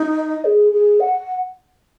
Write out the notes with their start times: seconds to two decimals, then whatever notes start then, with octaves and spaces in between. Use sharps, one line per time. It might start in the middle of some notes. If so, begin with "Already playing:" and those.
Already playing: D#4
0.17 D#5
0.45 G#4
0.72 G#4
1.00 F#5